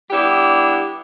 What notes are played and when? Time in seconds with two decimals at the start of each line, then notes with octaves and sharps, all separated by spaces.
0.10 G3 B3 D4 E4 G4